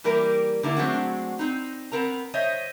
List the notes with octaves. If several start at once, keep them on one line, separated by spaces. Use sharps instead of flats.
E3 G3 A#3 G4 A#4
D3 A#3 E4
F#3 G#3 A3 C4 D4 F#4
C4 D#4
B3 C4 A#4 A#5
C5 C#5 D#5 E5